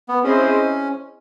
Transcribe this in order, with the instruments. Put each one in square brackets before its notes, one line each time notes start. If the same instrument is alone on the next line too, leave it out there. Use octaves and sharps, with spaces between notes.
[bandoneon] B3
[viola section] C4 E4 G#4 C5 D#5 [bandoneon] C#4